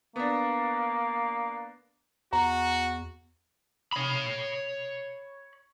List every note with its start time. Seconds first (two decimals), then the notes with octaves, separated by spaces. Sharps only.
0.16 A#3 B3 D4
2.33 E2 F#4 A#5
3.92 C#5 B5